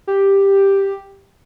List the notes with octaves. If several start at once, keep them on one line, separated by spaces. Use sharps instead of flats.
G4